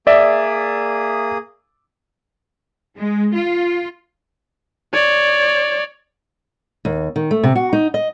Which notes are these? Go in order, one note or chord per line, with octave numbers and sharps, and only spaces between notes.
A#3 G#4 D5 E5 D#6
G#3
F4
C#5 D5
D#2
D#3
A3
C3
F#4
D#4
D#5